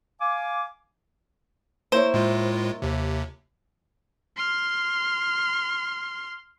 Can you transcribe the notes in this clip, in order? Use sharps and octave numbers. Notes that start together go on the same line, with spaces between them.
F5 G#5 D6
A#3 E4 C5 C#5
A2 G#3 F4
D#2 C3
C6 F6